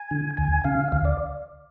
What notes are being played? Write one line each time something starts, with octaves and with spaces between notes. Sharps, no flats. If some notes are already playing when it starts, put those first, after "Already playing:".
Already playing: G#5
D3
D2 G#5
C#3 F5
D2 F5
D5